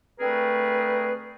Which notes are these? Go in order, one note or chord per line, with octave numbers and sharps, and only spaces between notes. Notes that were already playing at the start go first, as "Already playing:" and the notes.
D3 A3 C4 G#4 A#4 B4